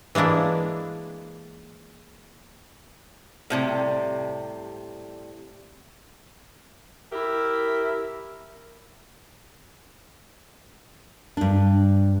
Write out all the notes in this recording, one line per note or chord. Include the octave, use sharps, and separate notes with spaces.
E3 G#3 A#3 D4 E4
A2 C3 G3
E4 G4 A#4 E5
G2 D4